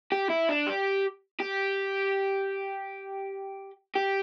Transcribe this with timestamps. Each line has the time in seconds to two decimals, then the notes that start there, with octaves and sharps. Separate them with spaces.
0.12 G4
0.30 E4
0.49 D4
0.67 G4
1.40 G4
3.95 G4